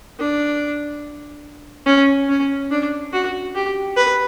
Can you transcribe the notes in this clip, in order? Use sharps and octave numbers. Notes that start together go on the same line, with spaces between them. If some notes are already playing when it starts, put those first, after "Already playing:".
D4
C#4
C#4
D4
F#4
G4
B4